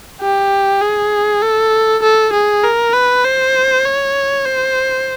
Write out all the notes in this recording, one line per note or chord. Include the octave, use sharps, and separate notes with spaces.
G4
G#4
A4
A4
G#4
A#4
B4
C5
C#5
C5